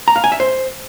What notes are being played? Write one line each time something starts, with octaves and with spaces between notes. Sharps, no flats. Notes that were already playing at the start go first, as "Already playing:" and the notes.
A#5
F5
G#5
E5
C5